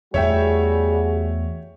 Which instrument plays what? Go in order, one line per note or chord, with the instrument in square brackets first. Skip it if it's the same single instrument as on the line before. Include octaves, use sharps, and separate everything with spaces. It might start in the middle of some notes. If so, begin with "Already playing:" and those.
[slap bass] E2 A3 [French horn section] G3 F#4 G#4 [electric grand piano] C#5 E5 G5